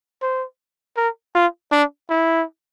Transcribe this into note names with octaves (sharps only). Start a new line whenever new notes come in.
C5
A#4
F4
D4
E4